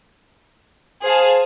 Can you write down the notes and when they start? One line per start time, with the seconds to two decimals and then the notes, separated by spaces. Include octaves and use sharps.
1.03 G#4 C5 F5 A5